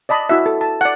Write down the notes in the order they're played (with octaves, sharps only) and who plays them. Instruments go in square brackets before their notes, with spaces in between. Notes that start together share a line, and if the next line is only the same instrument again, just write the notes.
[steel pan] D5 D#5 A5 B5
E4 F#4 E5
A4 A5
A5
D5 F#5